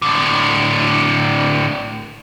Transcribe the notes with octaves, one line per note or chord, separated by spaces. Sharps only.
A2 D3